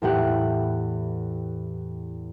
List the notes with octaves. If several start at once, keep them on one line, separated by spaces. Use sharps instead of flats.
E2 A2 G4 F#5